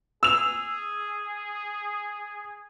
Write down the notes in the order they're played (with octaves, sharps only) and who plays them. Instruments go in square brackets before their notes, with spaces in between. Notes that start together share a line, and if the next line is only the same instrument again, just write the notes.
[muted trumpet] G#4 [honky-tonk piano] E6 F7